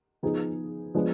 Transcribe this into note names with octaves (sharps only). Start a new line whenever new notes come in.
F3 B3 D#4 G#4
F3 G#3 B3 D4